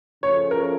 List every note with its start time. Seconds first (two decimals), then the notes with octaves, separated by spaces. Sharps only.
0.23 C#3 F3 A3 C#4 C#5
0.51 A#4